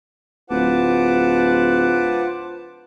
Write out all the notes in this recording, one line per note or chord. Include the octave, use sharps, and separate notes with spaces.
D1 F4 B4 C5 F#5 A5 D6